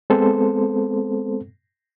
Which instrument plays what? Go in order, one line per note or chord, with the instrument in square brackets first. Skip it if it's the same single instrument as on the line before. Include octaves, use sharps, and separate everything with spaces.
[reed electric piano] G#3 B3 C4 A4 C5